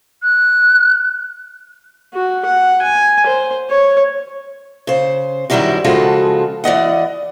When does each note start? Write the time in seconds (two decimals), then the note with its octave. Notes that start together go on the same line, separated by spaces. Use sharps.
0.22 F#6
2.14 F#4
2.45 F#5
2.82 G#5
3.26 C5
3.70 C#5
4.87 C#3 C5
5.50 F#2 D#3 F#3 G3 E4 F#4
5.84 C#3 F3 G#3 F4 F#4 A4
6.64 E3 D5 D#5 F#5